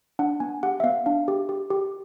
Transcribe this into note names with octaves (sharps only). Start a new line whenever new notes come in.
D4 F#5
B3 G#5
G4 F#5
E5
B3 F5
D4 F5
G4
G4
G4